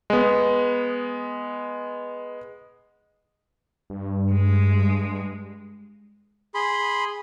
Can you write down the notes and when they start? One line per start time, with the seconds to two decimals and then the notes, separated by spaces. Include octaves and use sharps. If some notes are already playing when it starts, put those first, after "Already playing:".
0.10 G#3 B3
3.90 G2
4.31 G#3
6.55 G#4 B5 C6